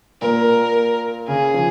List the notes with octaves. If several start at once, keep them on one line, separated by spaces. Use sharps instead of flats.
A#2 A#4
C#3 G#4
F3